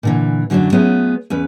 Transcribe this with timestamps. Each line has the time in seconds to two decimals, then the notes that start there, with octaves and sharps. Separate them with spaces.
0.03 A#2 D3 E3
0.50 F#2 D3 F#3 A3 D4
0.72 F#3 A3 B3 C#4 F4 G#4
1.30 E2 C#4 B4